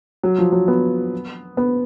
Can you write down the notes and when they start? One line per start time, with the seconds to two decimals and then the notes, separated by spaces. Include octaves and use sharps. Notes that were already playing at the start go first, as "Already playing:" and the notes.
0.23 F#3
0.38 F3
0.52 F#3
0.68 B3
1.57 B3